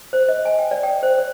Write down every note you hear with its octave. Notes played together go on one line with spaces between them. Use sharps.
C5
D#5
G#5
G5
D5
G5
C5
C#5